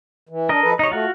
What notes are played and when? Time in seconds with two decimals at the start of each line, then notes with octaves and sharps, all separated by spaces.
0.29 E3
0.49 D4 A#4 D#5
0.62 F3 A4 B4
0.79 C3 D#4 C#5 D#5
0.91 A3 F4 F#4